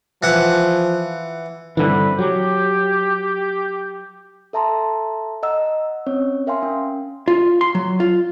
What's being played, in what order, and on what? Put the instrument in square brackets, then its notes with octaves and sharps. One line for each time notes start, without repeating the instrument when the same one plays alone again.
[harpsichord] E3 F#5 [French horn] F3
[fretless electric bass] G2 D3 E3 [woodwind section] C4 B4
[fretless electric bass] F#3 [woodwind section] G4
[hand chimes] A4 E5 A5 A#5 C6
D#5 F#5 A#5 E6
C4 C#4 C#5
A#4 E5 F5 G5 G#5 C6
C#4
[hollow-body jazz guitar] F4
C6
F#3
F4